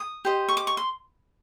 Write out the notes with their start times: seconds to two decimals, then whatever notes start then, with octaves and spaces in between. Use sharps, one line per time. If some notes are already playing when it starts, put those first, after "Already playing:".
Already playing: D#6
0.25 G4 C5 D#5
0.49 C#6
0.57 D6
0.67 C#6
0.77 C6